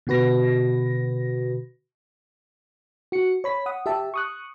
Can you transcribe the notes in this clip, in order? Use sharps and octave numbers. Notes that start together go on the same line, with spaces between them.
B2 D3 F#4 B4 A#6
F#4 C#7
C#5 B5 B6
F#5 D#6
G4 E5 A5
C#6 D#6 F#6